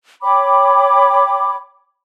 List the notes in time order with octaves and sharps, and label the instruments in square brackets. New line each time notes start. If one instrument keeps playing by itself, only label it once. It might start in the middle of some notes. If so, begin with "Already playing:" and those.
[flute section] C#5 G5 B5 D6